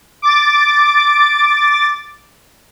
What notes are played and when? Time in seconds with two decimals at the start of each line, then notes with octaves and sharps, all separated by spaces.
0.22 D6 A6